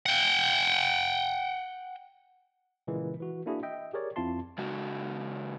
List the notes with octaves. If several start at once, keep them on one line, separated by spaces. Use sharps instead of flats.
F#5 G5
A#2 C#3 E3 G#3 A#3
E3 F#4
A#3 D4 E4 F#4 G#4
D#5 E5 G5
G4 G#4 A#4 C#5 D5
F2 C4 E4 F4 A5 C6
C#3 G#3 F#4